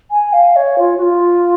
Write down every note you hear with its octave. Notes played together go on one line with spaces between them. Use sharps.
G#5
F5
C#5
F4
F#4
F4